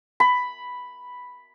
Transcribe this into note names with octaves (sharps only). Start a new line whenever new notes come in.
B5